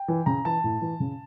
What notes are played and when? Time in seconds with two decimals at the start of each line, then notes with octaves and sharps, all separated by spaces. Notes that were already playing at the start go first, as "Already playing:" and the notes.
Already playing: G5
0.08 E3
0.26 C#3 A#5
0.45 E3 A5
0.64 A2
0.82 E3
1.00 C#3